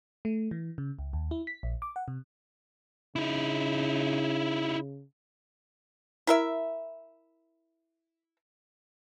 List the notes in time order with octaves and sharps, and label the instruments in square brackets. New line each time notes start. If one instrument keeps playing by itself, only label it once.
[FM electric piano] A3
E3
C#3
C#2
D#2
E4
B6
A#1
D6
F#5
C3
[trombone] C#3 [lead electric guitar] D#4 E4
[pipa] E4 A#4 E5